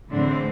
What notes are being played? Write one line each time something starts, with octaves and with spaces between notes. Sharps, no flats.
A2 D3 E3 G#3 C4 D4